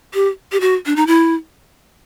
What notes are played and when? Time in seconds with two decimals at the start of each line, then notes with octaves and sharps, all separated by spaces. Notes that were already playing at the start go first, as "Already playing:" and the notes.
0.14 G4
0.52 G4
0.61 F#4
0.86 D4
0.96 D#4
1.07 E4